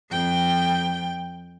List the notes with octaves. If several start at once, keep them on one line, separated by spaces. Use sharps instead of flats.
F2 G5